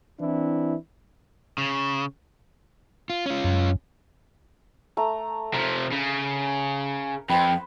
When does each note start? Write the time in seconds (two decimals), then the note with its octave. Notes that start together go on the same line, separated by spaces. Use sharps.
0.20 E3 C4 D4 E4
1.58 C#3
3.10 F4
3.26 C#4 F4
3.44 F#2
4.97 A3 A#5
5.54 C3 F3 A#4
5.93 C#3
7.30 F2 B4 C5 G5